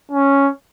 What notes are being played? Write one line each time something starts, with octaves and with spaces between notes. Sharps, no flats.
C#4